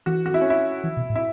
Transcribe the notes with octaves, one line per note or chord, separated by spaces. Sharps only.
E3 F#4
F#4
E4
C#4
E4
E3
B2
A2
E4